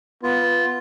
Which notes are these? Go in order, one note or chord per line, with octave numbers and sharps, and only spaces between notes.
B3 F4